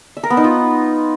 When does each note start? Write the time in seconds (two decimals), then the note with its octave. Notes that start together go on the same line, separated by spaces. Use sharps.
0.17 E5
0.23 A#4
0.30 B3
0.37 D#4
0.44 F4